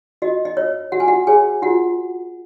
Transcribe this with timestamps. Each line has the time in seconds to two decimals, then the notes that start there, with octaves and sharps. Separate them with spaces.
0.22 F#4 D#5
0.45 D#5
0.57 C#5
0.92 F#4 F#5
1.00 G#5
1.08 F#4 F#5
1.27 G#4 C#5 G#5
1.62 F4 F#4 F#5